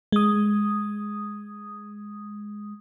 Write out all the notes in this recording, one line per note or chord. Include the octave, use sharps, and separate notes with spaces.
G#3 D#6